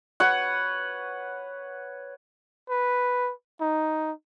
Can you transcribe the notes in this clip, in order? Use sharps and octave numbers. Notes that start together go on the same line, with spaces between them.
B4 C#5 F#5
B4
D#4